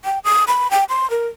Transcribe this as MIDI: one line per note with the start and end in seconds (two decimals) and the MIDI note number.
0.05 0.19 79
0.24 0.44 87
0.48 0.70 83
0.71 0.84 79
0.89 1.10 84
1.10 1.27 70